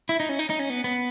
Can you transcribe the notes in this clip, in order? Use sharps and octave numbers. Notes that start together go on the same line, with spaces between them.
E4
D#4
C#4
D#4
D#4
C#4
B3
B3